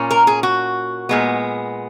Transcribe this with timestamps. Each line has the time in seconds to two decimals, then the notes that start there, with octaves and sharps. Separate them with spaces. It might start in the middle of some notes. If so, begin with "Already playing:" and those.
Already playing: A#2 A#3 C#4
0.11 A#4
0.27 G#4
0.43 F#4
1.09 A#2 G#3 B3